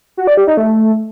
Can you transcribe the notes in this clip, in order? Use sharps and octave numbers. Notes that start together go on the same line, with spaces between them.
F#4
D5
G4
D#4
A3